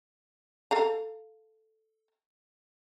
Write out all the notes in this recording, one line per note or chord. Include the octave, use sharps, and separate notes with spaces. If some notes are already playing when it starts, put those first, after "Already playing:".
A4 F5 A#5